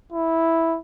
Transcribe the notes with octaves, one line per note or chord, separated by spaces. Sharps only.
E4